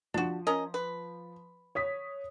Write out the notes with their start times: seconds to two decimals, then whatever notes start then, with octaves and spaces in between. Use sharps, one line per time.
0.14 F3 D4 F#4
0.47 C#4 A#4 D#5
0.74 B4
1.75 C#5 D#6 B6